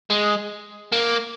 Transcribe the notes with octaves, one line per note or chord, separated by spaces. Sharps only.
G#3
A#3